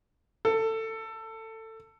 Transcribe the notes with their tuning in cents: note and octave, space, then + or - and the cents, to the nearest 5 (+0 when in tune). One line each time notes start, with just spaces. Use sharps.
A4 +20